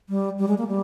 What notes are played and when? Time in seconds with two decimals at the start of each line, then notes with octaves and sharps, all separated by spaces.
0.09 G3
0.39 G3
0.48 G#3
0.58 A#3
0.68 G3